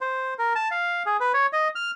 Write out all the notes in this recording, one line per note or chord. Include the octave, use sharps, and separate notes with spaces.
C5
A#4
A5
F5
G#4
B4
C#5
D#5
F6